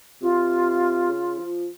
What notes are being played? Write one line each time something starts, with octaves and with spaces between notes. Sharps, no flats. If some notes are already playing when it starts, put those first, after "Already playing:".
C3 F4
C#3
F3